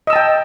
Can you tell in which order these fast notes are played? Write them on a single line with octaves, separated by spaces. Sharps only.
D#5 E6 A5 G5